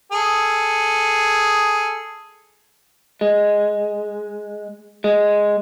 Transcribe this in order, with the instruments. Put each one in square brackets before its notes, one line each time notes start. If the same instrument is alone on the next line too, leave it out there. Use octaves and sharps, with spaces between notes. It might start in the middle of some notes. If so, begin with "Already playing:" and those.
[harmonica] G#4 A4
[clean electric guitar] G#3
G#3